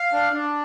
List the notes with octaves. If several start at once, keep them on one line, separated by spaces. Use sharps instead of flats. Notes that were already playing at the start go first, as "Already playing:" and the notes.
Already playing: F5
D4
D4